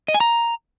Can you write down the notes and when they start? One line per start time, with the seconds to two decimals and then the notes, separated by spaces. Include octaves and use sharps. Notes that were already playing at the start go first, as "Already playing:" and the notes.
0.08 D#5
0.14 G#5
0.20 A#5